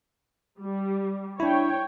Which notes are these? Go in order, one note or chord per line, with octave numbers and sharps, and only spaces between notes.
G3
D4 E4 C#5 G5